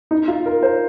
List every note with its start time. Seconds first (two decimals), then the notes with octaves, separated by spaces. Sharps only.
0.11 D#4
0.28 F4
0.46 A#4
0.62 C5